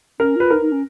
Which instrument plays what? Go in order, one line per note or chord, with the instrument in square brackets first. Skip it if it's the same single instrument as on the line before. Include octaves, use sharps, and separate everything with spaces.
[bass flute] C#4 [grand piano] A#4
[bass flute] F4 [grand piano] B4
[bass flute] D#4 [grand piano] A#4
[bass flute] D#4
C#4